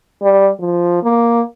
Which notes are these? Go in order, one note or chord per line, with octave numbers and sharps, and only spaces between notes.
G3
F3
A#3